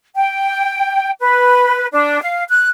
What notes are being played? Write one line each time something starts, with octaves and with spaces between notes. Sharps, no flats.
G5
B4
D4
F5
F#6